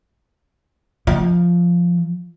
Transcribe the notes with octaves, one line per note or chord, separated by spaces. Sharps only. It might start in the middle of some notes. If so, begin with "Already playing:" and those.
F3